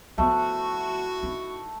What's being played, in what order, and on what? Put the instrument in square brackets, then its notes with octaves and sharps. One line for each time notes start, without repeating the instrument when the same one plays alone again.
[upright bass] F3 B3 [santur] A3 [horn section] E4 F#4
[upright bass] D#4